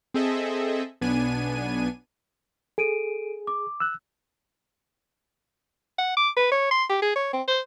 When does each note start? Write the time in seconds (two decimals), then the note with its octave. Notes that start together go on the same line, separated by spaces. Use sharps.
0.14 C4 G#4 A4 D#5 E5
1.01 B1 B3 D4 G#5 D#7
2.78 G#4 A4 D7 D#7
3.47 D6
3.80 E6 F#6
5.98 F#5
6.17 D6
6.37 B4
6.52 C#5
6.71 C6
6.89 G4
7.02 G#4
7.16 C#5
7.33 C4
7.48 C5